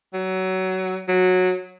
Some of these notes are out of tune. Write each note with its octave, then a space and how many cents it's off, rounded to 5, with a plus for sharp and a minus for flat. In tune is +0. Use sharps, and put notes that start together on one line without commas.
F#3 +20
F#3 -15